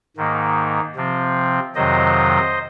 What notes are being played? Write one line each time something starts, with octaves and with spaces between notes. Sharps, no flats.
G#2 D#3 A#3
C3 F3 C4
F2 C3 D#3 F#3 C5 D#5